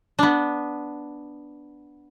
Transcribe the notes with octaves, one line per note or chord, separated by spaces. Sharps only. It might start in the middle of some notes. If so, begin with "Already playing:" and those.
B3 D4